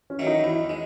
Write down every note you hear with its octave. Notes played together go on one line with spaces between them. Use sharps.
C#4
D#3 F#3 A3
D#4
E2 E4
G#3